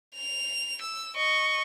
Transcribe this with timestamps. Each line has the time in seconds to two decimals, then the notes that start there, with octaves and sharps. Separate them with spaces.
0.16 F7
0.81 E6
1.16 D#5 C#6